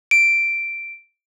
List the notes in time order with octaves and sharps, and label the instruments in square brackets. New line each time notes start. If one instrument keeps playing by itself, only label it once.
[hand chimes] D7